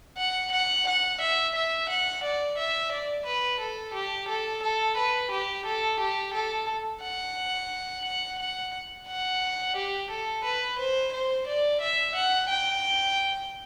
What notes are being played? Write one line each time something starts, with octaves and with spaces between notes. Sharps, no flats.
F#5
F#5
F#5
E5
E5
F#5
D5
E5
D5
B4
A4
G4
A4
A4
B4
G4
A4
G4
A4
F#5
F#5
F#5
F#5
G4
A4
B4
C5
C5
D5
E5
F#5
G5